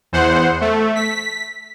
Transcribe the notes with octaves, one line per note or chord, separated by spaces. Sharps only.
E2 C5 F#5
A3
B6